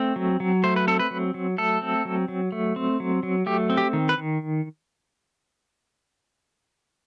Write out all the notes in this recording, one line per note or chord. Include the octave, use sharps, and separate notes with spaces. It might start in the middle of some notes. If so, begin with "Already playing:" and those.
Already playing: A3 C4
F#3
F#3
A3 C5
B4
C4 A4
B4
F#3
F#3
A3 A4
C4
F#3
F#3
A3
C4
F#3
F#3
A3 G4
C4
G4
D#3
B4
D#3